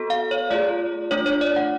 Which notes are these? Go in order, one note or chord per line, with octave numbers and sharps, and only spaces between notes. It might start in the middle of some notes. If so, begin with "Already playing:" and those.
Already playing: B3 F#4 A4
F5
C#5
A3 F4 G#4 D5
A3 D4 F4 C#5
C#5
D5
F#5